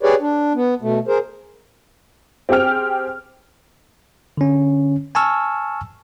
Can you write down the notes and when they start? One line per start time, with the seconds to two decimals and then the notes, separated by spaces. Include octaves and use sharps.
0.03 G4 G#4 B4 C#5 D5
0.20 D4
0.54 B3
0.82 B2 A3
1.08 G#4 A#4 C5
2.49 C4 G4 G#4 G5 F6
4.37 D3 C#4
5.15 G#5 A5 C#6 E6 F6